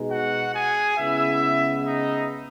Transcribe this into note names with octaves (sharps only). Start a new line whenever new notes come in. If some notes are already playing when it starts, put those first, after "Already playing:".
Already playing: B2 G#3 D#4
F#4 F#5
G#4 G#5
C#3 G#3 B3 E4 E5
D#4 D#5